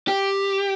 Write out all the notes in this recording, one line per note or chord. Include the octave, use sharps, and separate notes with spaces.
G4